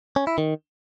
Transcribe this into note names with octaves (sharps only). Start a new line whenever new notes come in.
C#4
E4
D#3